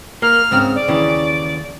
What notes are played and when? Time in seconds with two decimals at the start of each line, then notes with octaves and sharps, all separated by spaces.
0.22 A#3 F6
0.51 G#2 C#3 C4
0.75 D5
0.88 D#2 C#3 E3